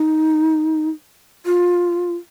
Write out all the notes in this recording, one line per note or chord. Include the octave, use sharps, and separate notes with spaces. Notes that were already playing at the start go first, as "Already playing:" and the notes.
Already playing: D#4
F4